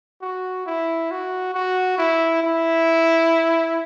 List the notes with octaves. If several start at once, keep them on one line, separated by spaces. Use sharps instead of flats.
F#4
E4
F#4
F#4
E4
E4